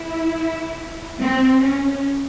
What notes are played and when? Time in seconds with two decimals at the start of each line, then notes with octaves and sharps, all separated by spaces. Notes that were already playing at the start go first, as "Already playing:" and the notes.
Already playing: E4
1.21 C4
1.62 C#4